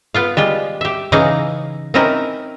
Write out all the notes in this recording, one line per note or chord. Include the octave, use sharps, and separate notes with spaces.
B3 F4 F5
G3 G#3 F4
G4 E5
C#3 E3 D#4 G#4 F5 A#5
C4 C#4 D#4 E4 A#4